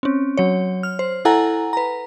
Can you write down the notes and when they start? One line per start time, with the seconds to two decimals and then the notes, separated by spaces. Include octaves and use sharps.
0.03 C4 C#4
0.37 F#3 C#5
0.83 F6
0.99 C5
1.25 E4 A4 F#5 G#5 A#5
1.73 B4 A#5